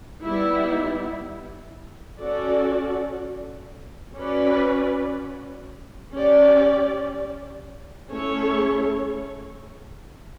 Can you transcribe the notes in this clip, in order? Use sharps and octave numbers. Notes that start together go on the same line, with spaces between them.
G3 B3 E4
C#4 F#4 A4 D5
C#4 F#4 B4 D5
C#4 G4 D5
A3 C#4 E4 A4 C#5